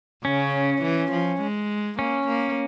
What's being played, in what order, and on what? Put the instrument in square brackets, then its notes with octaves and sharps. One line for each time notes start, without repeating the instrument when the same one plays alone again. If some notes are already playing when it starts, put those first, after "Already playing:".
[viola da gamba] C#3 [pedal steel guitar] C#4
[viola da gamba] E3
F3
G#3
[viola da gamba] A#3 [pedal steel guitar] C#4
[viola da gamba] A#3